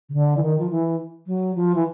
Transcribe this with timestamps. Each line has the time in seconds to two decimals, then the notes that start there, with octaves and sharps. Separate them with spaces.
0.09 C#3
0.13 D3
0.37 E3
0.42 D#3
0.58 F3
0.70 E3
1.26 F#3
1.55 F3
1.75 E3